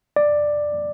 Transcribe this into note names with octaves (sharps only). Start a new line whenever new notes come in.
D5